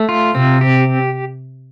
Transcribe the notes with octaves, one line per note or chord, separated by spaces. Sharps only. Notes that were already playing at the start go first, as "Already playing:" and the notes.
Already playing: A3
F4
C3 C4
G4